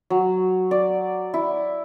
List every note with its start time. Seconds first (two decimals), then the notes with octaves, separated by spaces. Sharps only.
0.10 F#3
0.71 D5
1.34 E4